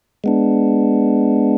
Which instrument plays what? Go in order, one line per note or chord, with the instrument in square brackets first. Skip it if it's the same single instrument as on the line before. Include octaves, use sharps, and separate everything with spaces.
[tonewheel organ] G#3 B3 D4